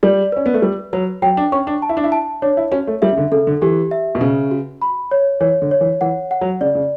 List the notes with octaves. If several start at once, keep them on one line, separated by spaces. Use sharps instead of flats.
G3 D5
C#4 B4
B3
A3
G3 B4
F#3 B4
F#3 G5
D4
C#4 C#6
D4
A5
E4
D4
E4
A5
D4 C#5
E4
C#4 F#4
A3
G3 E5
C#3
D3
C#3 A4
D3
E3 G4
E5
B2
C#3 B4
F#4
B5
C#5
E3 C#5
D3
C#5
E3
E3 F#5
F#5
F#3
C#3 D5
C#3